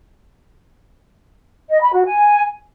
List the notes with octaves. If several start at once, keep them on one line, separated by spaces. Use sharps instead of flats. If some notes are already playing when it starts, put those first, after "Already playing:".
D#5
B5
F#4
G#5